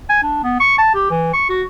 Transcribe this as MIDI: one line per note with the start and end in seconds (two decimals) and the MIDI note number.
0.09 0.20 80
0.23 0.41 62
0.44 0.57 59
0.60 0.77 85
0.78 0.93 81
0.94 1.09 67
1.10 1.30 52
1.33 1.45 85
1.49 1.62 66